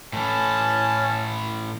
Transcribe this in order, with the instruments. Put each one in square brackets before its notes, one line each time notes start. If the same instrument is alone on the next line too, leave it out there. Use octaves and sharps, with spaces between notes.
[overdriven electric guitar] A2 E3 [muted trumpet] C#4 [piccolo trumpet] A5